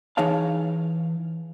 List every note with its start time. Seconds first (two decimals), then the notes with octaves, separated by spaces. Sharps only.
0.17 E3 D#4 G#4 C#5 F5 A5